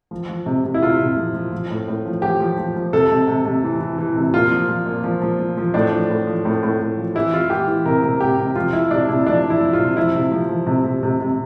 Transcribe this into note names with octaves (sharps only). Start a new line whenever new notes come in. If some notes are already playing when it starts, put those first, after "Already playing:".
F3
F3
C3
C3
E4
C3 F4
C3
F3
F3
F3
A2
A2
F3
F3 G4
F3
F3
F3
C3 A4
C3
C3
C3
E3
E3
E3
C3
A#2 F4
F3
F3
A#2
F3
F3
F3
F3
A2 D4
F3
A2
F3
A2
A2
A2
F3
E3 E4
E3 F4
E3 G4
E3
C3 A#4
C3
C3 G4
C3
F3 F4
F3 E4
C3 D4
C3 E4
F3 D4
F3
E4
F3
F4
C3
F3 E4
C3
F3
F3
C3
C3
C3
C3